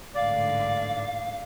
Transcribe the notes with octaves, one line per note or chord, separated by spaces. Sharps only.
A1 G#2 D3 D5 F5